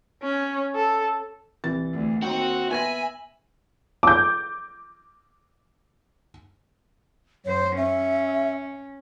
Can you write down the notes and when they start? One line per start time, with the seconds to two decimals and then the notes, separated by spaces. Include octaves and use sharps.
0.23 C#4
0.75 A4
1.64 C2 E3 A6
1.93 D2
2.22 D#2 C4 D#4 F#4 G5
2.71 B3 E5 G#5 B5 G#6 A#6
4.03 D6 G6
7.45 F#2 C5 C#5
7.77 C#4 E5